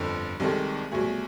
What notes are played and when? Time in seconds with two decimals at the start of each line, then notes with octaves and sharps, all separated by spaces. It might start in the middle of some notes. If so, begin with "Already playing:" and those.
Already playing: G1 F2 D3
0.40 C2 C3 D#3 G#3 A4
0.91 C2 B2 F#3 A3 G#4